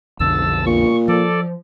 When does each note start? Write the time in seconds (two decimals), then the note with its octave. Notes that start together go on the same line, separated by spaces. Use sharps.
0.20 B1 F2 D3 A5 E6
0.66 A#2 C#6
1.08 F3 A4 D5